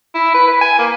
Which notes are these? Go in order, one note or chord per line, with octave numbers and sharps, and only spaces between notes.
E4
B4
B4
G#5
A#3